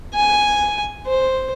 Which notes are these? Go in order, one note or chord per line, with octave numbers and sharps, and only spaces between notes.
G#5
C5